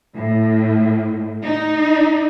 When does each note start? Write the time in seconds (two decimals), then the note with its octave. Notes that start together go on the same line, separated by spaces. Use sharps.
0.14 A2
1.44 D#4